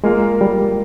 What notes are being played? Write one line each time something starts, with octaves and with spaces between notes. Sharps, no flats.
G#3 A#3 F4 A#4
G3